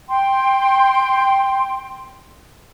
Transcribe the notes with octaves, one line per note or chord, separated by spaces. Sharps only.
G5 C6